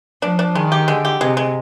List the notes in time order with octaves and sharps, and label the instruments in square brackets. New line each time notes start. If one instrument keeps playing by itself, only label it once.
[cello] F3 [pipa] D4
[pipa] D4
[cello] D#3 [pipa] G#3
[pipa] G4
[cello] D3 [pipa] G#3
[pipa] G4
[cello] C3 [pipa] G#3
[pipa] G#3